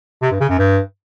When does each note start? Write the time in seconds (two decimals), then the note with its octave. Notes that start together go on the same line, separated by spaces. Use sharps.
0.22 C3
0.31 G2
0.40 C#3
0.49 F#2
0.58 G2